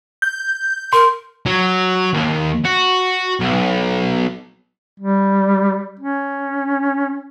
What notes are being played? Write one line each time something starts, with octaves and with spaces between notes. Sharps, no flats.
G6
A#4 C6
F#3
D#2
F#4
B1
G3
C#4